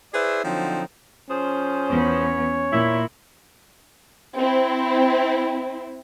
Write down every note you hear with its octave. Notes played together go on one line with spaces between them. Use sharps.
E4 G#4 B4 C5 D5 E5
D3 F3 F#3 C4 D#4
F3 C#4 G#4 C5
E2 B3 C#5
A#2 E4
C4 E4